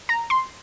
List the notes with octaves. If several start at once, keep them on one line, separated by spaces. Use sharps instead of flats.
A#5
C6